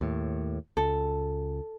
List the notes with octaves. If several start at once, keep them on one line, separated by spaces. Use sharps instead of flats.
D#2 A2
C#2 A4